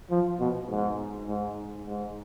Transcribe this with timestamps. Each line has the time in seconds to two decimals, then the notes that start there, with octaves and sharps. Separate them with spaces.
0.10 F3
0.39 B2
0.70 G#2
1.28 G#2
1.87 G#2